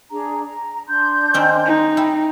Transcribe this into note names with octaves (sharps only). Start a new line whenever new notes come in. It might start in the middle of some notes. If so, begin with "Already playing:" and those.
D4 G#4 A#5
A#5
D4 C6 G6
D#3 C4 C#4
D#4
E4 G5